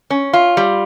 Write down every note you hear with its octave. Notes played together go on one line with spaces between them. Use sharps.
C#4
F4
G3